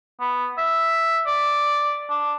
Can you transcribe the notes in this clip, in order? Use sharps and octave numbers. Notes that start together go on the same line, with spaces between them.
B3
E5
D5
D4